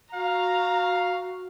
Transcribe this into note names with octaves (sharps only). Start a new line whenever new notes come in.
F#4 F5 A#5